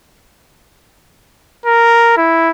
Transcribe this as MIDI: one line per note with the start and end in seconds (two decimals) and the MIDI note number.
1.66 2.13 70
2.17 2.51 64